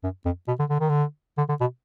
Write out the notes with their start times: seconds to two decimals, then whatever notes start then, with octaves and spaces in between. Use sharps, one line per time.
0.03 F#2
0.25 F2
0.48 B2
0.59 D3
0.69 D3
0.80 D#3
0.89 D3
1.38 D3
1.49 D3
1.60 B2